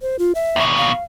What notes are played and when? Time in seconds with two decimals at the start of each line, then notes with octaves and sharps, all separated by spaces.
0.02 C5
0.19 F4
0.35 E5
0.56 D#2 B2
0.78 F5